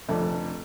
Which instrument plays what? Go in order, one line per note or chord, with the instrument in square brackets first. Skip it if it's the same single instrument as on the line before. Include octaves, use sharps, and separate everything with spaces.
[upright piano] F1 F2 D3 A3 D4